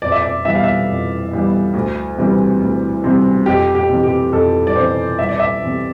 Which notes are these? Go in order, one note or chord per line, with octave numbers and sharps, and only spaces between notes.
F2 D5
E5
D5
E3 G3 B3 E5
F5
E5
F2
E3 G3 B3
D2
C3 E3 G3 C4
D2
C3 E3 G3 C4
F2 G4
G4
C3 E3
G4
F2 A4
D5
C3 E3 C5
C2 E5
D5
E5
C3 E3